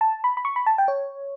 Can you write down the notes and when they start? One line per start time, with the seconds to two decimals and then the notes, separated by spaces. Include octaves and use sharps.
0.01 A5
0.24 B5
0.37 B5
0.45 C#6
0.56 B5
0.66 A5
0.78 G5
0.88 C#5